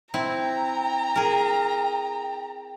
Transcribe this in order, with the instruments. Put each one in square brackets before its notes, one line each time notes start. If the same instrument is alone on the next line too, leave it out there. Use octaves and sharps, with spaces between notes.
[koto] C4 E4 [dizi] G5 [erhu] A#5
[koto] G#4 A#4